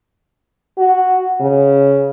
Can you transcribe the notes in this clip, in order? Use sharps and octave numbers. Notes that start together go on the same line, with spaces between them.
F#4
C#3